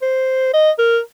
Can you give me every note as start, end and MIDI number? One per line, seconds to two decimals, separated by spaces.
0.02 0.53 72
0.53 0.71 75
0.78 0.99 70